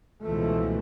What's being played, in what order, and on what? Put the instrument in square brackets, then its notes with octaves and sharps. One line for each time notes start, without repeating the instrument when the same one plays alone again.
[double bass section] C#2 B2 E3 F3 A3